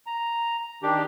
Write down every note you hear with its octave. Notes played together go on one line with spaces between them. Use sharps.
A#5
D#3 D4 G4